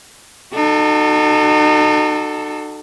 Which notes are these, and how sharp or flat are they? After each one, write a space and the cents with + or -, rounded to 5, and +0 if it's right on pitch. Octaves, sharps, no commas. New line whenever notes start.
D#4 -40 F#4 +15 A4 +0